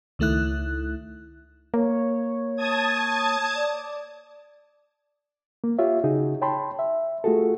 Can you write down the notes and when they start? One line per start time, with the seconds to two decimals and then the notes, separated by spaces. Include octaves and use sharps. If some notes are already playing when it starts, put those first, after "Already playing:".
0.19 C#2 D#3 A3 E4 F#6
1.74 A#3 C#5
2.56 A5 D#6 G#6
3.55 D5
5.64 A#3
5.79 F4 G4 C#5 E5
6.04 C#3 D#4 F#4 G#4
6.41 C#5 G5 A5 B5 C6
6.79 E5
7.24 A3 F4 F#4 G#4 A4